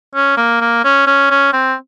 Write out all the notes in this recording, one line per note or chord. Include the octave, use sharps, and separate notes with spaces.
C#4
A#3
A#3
C#4
C#4
C#4
C4